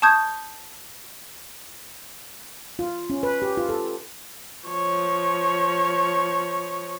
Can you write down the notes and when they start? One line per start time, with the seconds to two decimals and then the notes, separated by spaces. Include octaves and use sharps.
0.02 A5 C#6 D#6 G6 G#6
2.79 F4
3.10 C#4
3.23 B4
3.42 G4
3.57 F4
3.69 A4
4.69 F3 C#5